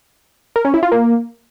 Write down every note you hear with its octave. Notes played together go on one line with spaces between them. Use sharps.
A#4
C#4
E4
F4
A#3